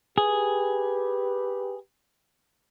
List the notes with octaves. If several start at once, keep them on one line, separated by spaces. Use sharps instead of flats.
G4 G#4 B4